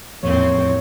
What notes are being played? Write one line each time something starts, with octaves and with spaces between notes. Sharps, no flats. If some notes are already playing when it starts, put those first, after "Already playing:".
E2 A2 F3 G3 A#3 C4 C#5